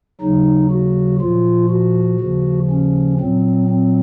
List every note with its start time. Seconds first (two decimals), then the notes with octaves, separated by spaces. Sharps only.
0.21 D#2 C#3 F#3 D#4
0.71 F#4
1.20 A#2 F3 F4
1.70 F#4
2.20 D#2 C#3 F3
2.70 C#4
3.19 A#2 F#3 C4
3.69 C4